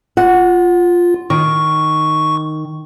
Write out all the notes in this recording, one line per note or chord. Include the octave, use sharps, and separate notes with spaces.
F4 F#5
D#3 C#6